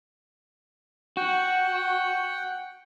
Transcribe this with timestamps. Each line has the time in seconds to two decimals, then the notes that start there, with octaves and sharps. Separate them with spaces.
1.17 F#4 F#5 G5